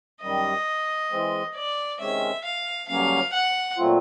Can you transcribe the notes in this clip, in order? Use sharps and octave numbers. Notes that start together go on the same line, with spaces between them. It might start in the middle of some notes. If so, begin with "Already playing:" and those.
F#2 D#3 G3 D#5
E3 G#3 C4
D5
C3 D#3 G#3 C#4 E5
F5
G2 D3 F#3 A#3 C#4 F5
F#5
A#2 F#3 A3 C4 F4